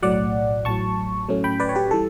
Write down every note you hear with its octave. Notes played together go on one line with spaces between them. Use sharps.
B1 A2 F#3 D5 F#5
A1 A2 F#3 A5 C#6
A2 F#3 A3 C#4
G5 B5
B4 D5
C#5
G4 B4
E3 G3 A4